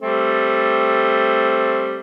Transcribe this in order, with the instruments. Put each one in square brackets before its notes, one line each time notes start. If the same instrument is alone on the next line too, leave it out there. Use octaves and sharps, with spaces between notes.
[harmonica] G3 A3 C4